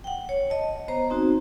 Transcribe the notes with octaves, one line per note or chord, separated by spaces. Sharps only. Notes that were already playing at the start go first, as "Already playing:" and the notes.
F#5 G5
C#5
D#5 A5
B3 C5 A#5
C4 D#4 F#4